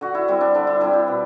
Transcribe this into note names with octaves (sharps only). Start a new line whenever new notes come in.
D3 F#4
E4
G3 C4 E4
D4
D3 D4
E4
G3 C4 E4
G4
B2